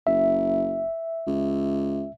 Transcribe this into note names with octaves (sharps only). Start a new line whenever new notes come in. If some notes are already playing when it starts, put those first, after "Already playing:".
F#1 E5
C#2